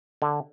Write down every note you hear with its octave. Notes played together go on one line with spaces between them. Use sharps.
D3